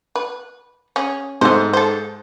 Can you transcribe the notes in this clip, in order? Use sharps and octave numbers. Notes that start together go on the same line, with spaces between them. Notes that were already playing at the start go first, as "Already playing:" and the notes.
B4
C#4 G#4
G#2 A3 C5
A4 C5